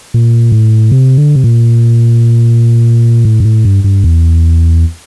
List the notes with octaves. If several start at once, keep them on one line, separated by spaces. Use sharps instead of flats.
A#2
A2
C3
D3
C3
A#2
A2
G2
A2
G2
G2
E2